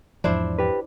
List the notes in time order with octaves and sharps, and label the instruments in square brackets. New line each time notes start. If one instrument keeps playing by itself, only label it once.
[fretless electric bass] E2 G#2 F3 [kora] D4 E4 C5
[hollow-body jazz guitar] G4 B4